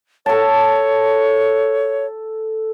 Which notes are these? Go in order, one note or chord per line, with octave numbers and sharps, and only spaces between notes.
A4 C#5 A5